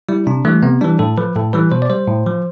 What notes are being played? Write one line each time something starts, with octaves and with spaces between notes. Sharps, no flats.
G3 E4
C3 D4
E3 G3 A3
C3 B3
E3 G3 D4
A2 A4
F3 B4
A2 A4
E3 G3 B4
B2 C5
D5
G3 C5
A2
F3